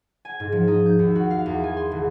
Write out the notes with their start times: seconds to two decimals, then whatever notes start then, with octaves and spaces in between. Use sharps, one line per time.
0.25 G#5
0.40 G#2
0.52 F3
0.67 D#4
0.86 G6
0.99 D#2
1.15 F#4
1.31 F5
1.46 E2
1.64 G#5
1.77 C6
1.92 G#1